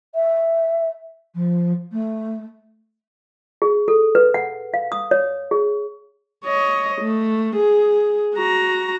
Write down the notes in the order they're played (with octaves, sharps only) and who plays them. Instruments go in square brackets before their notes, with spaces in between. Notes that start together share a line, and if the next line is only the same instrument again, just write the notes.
[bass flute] E5
F3
A3
[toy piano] G#4
A4
B4
F#5
F5
D#6
C#5
G#4
[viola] C#5 D#5
A3
G#4
F#4 A#5